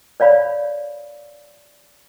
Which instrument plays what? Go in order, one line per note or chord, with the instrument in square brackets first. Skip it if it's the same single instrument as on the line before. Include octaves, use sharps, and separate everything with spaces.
[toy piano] C#5 D5 F5 B5